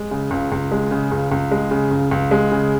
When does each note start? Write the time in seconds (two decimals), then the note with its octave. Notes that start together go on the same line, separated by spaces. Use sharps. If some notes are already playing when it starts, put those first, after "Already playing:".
Already playing: G#3
0.11 C#3
0.31 C#2
0.52 C#2
0.71 G#3
0.91 C#3
1.11 C#2
1.32 C#2
1.51 G#3
1.71 C#3
1.91 C#2
2.11 C#2
2.31 G#3
2.52 C#3